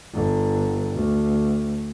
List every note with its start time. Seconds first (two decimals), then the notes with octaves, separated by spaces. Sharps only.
0.13 G1 D3
0.95 D2